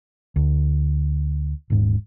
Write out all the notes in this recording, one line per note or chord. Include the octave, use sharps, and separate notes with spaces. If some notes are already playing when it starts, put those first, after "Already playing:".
D2
D#1 G#2